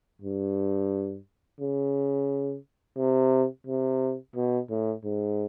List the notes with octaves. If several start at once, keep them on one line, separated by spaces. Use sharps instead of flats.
G2
C#3
C3
C3
B2
A2
G#2